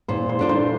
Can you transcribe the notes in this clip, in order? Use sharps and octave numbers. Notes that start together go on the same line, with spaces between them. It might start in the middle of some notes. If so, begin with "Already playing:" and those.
A#2 C5
C5
A3 D4 F4
C5